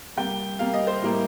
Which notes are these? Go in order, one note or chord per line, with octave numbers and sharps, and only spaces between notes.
C3 G3 A#3 G5
C3 G3 A#3 F5
D#5
C5
A2 G3 A#3